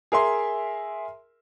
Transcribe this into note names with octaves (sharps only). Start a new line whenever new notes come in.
G#4 A#4 E5 C6